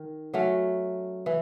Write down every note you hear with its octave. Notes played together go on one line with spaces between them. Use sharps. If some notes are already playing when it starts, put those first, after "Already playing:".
Already playing: D#3
F#3 A3 C#4
E3